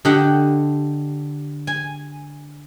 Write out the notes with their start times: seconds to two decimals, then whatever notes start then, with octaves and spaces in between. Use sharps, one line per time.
0.05 D3 D4 G4 D#5 F#5
1.67 G#5